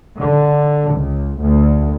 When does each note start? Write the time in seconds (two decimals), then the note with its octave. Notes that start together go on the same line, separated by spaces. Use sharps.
0.19 D3
0.95 C#2
1.40 D2